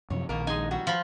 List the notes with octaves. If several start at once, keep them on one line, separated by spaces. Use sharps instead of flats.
F#2 C3 F3 C#5
A#1 B2 D#3 A#3 A#4
G#3 D#4 G#5
F#3 G3 F#4
F3 B5